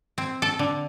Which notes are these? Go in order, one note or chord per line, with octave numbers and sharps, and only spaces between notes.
C4
A4
D3